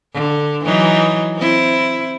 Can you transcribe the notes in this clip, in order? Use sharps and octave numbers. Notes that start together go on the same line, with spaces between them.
D3
E3 F#3 D#4
C4 E4